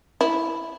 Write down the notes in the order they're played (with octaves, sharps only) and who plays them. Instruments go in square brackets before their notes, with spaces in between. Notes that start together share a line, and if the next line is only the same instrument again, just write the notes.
[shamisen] E4